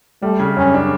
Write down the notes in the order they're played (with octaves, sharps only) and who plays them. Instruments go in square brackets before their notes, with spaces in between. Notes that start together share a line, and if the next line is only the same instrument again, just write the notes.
[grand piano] G3 [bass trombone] A3
[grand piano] C#3
[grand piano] F#2 [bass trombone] C#4
[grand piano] D4